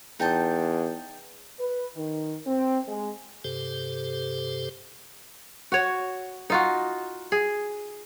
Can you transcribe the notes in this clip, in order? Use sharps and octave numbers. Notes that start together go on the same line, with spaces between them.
E2 D#4 G5 A5
B4
D#3
C4
G#3
G2 C3 G4 A4 C5
F#4 C#5
D#4 F4 F#4
G#4